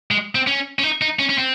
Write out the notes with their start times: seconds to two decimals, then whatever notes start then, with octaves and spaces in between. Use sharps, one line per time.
0.11 G#3
0.35 C4
0.47 C#4
0.79 C#4
0.83 D#4
1.02 D#4
1.19 C#4
1.29 C#4
1.38 C4